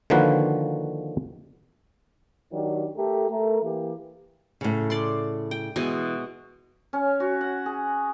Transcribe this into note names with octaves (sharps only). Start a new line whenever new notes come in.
D3 D#3 F3 A#3 F#4 B4
D#3 F#3 D4 G4
A3 G4 A4 A#4
A3 A#4
E3 A#3 G4
A2 C#3
D5 C6
G5
B2 E3 G#3 G#5
C#4
F#4
F#5
G#4